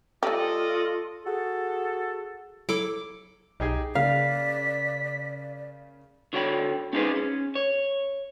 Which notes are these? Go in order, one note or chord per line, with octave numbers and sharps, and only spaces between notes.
A3 F4 G4 A4 D5 D#5
F#4 G#4 A4
F#3 E4 A4 D6
B1 D#4 G4 G#4
C#3 A#3 D5 F5 B6
D3 F#4 C#5 G5 B5
C#4 D#4 F4 G#4 B4 C5
C#4
C#5